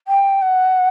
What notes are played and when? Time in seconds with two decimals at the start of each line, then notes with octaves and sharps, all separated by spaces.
0.07 G5
0.41 F#5